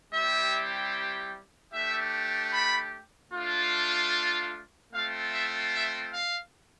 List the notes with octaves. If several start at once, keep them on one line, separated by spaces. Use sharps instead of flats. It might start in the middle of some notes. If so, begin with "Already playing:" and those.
G3 C4 E4 G4 E5
A3 D4 G4 E5
B5
A3 D4 F4
A3 C4 F4 F5
E5
E5
F5